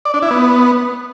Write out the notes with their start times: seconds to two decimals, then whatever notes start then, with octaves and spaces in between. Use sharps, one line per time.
0.05 D5
0.14 D4
0.22 E4
0.31 B3